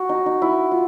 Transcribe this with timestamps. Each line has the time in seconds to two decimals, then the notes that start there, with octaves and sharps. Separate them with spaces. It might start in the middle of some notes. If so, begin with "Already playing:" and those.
Already playing: F#4
0.09 D#4
0.26 D#4
0.42 E4
0.71 F4